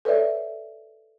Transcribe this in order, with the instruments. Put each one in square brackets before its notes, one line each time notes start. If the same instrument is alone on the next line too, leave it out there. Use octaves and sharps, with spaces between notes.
[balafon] A4 B4 C#5 D5 E5